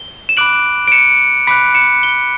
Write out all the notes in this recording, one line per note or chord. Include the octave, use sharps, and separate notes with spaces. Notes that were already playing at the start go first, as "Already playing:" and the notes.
Already playing: G7
E7
B5 D6 F#6 D7 F#7
D7
C#7 E7
B5 D6 F#6 B6 D7
C#7 E7
G7